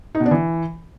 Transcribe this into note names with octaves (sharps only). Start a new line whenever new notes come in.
D#4
B2
D4
E3